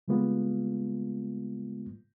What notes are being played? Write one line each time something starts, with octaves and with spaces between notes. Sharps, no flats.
C#3 G3 G#3 A#3 B3 F4